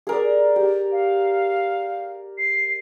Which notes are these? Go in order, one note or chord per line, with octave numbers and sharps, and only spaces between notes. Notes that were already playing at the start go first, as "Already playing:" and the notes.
G#4 A#4 D5
G4
F5
C7